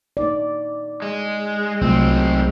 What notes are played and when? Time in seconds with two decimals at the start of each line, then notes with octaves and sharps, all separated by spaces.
0.17 A#3 D#4 D5
1.02 G#3
1.81 C2 F#3 G#3 A3 C4 F4